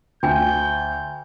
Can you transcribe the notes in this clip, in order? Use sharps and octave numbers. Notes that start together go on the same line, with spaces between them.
D2 G5 G#5 G6